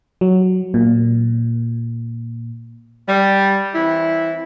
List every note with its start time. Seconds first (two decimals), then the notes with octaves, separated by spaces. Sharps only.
0.21 F#3
0.74 A#2
3.08 G3
3.75 E3 C4 E4